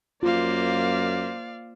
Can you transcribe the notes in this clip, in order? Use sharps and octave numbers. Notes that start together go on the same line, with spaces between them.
F#2 A#3 F4 C5 D5 F5